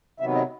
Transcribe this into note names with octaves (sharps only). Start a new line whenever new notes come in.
C3 D#3 F#3 B3 E5
D#5